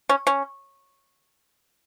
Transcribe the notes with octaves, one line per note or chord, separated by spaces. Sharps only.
C#4
C#4